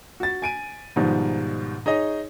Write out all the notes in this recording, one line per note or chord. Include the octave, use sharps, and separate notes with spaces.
F#4 A6
G#5 D7 D#7
G#2 B2 D#3 F3 G3
D#4 G#4 C#5 D#5